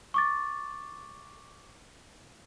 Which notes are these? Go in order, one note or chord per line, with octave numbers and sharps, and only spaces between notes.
C#6 D6 A6